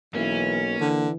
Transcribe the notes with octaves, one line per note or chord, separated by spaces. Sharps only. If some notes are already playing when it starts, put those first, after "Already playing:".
B1 E3 A#3 C#4
D3 E3